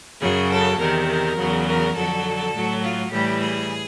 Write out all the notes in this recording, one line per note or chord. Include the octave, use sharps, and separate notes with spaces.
F#2 C#3 F#3 G#4
A4
E2 C3 D#3 A#4
A#4
E2 C#3 F#3
A#4
F2 D3 F#3 A4
A2 F#3
F4
A2 E3 G3 G4
G#4